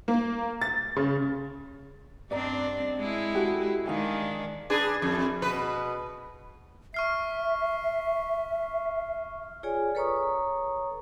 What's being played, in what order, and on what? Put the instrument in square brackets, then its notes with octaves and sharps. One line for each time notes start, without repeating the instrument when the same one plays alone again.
[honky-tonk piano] A#3
A6
C#3
[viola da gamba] G2 C4 D4 [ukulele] D5 D#5 A#5
[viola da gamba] G#3 E4
[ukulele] F#4 G4 A4
[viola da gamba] D#3 G#3 D4 [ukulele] D#4 F5 G#5
[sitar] D4 G#4 B4
F2
B2 B4
[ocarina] E5 [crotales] C#6 F6 C7
[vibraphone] F4 G#4 C#5 D5 G#5
A4 B4 C#5 A#5 C#6 D#6